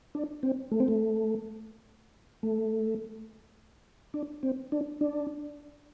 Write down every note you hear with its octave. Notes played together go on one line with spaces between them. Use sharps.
D4
C4
A3
C4
A3
A3
D4
C4
D4
D4